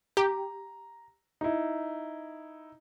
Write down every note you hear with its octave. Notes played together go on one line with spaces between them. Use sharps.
G4 A#5
D#4 E4